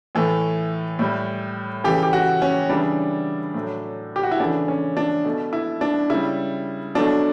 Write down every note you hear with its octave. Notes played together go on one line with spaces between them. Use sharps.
A2 E3 A3
A2 G3
C#3 E3 A3 G4
G4
F#4
C#4
C#3 E3 G3 D4
A2 F#3 A3
G4
F#4
E4
C#3 E3 A3 D4
C#4
D4
B2 A3
E4
D4
C#3 G3 E4
B2 F#3 A3 D4